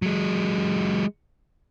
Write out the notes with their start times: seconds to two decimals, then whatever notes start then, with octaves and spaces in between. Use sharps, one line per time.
0.02 F#3 G#3